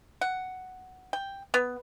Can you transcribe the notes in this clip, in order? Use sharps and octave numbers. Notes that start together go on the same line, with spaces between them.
F#5
G5
B3